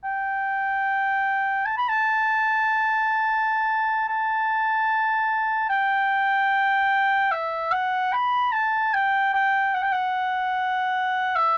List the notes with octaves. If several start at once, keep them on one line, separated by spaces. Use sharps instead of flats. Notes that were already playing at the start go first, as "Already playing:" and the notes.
G5
A5
B5
A5
A5
G5
E5
F#5
B5
A5
G5
G5
F#5
G5
F#5
E5